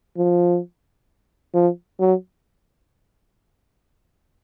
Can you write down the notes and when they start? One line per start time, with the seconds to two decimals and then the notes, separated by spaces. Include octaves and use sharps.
0.17 F3
1.54 F3
2.00 F#3